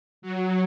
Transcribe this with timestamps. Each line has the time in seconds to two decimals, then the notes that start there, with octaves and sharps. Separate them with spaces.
0.22 F#3